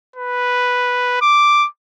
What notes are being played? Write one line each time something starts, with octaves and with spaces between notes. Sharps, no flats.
B4
D6